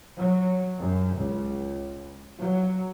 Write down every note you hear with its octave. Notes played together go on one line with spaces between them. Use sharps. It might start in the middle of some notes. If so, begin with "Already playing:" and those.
F#3
F#2
C#2
F#3